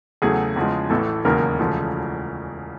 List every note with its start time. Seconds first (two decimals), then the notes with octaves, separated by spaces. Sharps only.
0.22 E2 C#3 F#3 A3 G#4
0.56 E2 C#3 F3 G#3
0.90 A1 A2 E3 A3 A4
1.25 E1 D#2 C#3 F#3 A#3 A#4
1.59 E1 D2 C#3 F3 A3